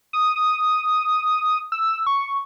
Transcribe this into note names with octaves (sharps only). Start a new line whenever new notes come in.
D#6
D#6
E6
C#6